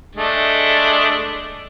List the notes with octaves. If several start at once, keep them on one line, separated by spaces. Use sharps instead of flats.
G#3 A3 D4